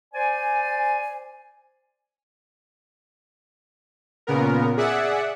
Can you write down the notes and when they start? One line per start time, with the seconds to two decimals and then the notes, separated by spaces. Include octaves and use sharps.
0.14 C5 D5 G#5
4.27 A#2 C#3 B3 A#4
4.77 G#4 D5 E5 F#5